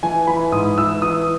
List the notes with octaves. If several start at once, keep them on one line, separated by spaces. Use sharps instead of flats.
E3 G#5
E3 B5
G#2 D#6
E3 E6
E3 D#6